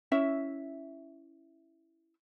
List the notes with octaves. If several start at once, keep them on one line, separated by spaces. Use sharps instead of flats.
C#4 E4 E5